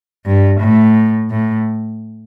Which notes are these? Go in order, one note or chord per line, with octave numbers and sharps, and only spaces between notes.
G2
A2
A2